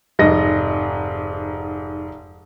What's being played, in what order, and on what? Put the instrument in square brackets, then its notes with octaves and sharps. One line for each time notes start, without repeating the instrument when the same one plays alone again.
[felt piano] F1 G#2 D#5 A#6